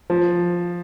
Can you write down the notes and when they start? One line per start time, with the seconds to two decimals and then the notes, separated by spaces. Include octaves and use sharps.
0.10 F3